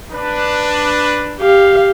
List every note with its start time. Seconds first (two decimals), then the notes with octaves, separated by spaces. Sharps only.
0.13 D4 B4
1.39 G4 F5